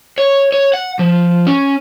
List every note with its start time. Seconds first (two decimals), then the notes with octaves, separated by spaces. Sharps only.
0.18 C#5
0.52 C#5
0.74 F#5
0.99 F3
1.47 C#4